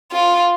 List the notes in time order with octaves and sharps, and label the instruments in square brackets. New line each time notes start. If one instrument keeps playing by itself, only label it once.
[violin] F4